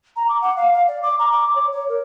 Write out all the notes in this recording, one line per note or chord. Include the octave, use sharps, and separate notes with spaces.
A#5
D6
F#5
F5
F5
D5
D6
A#5
D6
C#5
C#5
A#4